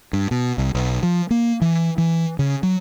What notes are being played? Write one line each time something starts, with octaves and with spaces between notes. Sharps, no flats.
G2
B2
C2
B1
F3
A#3
E3
E3
C#3
F#3